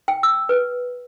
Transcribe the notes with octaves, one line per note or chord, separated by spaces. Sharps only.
G5
E6
B4